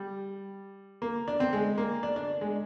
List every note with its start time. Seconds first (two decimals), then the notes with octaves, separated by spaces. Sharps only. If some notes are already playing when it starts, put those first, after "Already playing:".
Already playing: G3
1.02 A#3
1.28 D4
1.40 C4
1.53 G#3
1.78 A#3
2.03 D4
2.16 D4
2.41 G#3